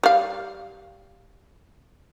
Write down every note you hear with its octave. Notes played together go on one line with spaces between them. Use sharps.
G3 F5